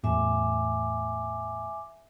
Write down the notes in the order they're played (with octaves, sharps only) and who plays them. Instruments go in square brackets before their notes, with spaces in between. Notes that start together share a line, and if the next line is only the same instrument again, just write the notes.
[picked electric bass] E2 A2 [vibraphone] E5 G#5 D6